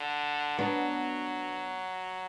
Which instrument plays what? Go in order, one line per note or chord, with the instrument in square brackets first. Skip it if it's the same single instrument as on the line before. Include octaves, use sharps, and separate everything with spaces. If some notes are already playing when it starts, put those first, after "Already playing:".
Already playing: [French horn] D3
[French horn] F#3 [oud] B3 D4